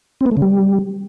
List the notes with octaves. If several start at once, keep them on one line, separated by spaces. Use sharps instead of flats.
C4
B3
A3
C#3
G3